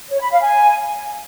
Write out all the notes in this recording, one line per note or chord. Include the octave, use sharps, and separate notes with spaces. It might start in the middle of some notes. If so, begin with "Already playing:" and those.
C#5
B5
F5
G#5